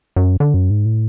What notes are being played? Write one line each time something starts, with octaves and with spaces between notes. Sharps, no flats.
F#2
D3
F#2
G#2
A2